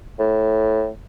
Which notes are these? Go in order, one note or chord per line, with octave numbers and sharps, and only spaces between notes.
A2